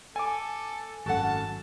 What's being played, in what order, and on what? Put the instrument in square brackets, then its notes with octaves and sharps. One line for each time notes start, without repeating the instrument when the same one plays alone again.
[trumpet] A4 [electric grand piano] G#5 D6
[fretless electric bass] G#1 F#2 [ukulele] F#4 A4 F#5 [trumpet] A5